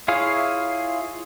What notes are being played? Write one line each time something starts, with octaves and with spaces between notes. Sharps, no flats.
E4 F4 G#4 C#5 F5